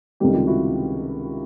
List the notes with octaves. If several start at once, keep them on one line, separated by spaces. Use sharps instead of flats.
C#2 C3 D#3 G3 G4 A4
F4 G4
E4 F#4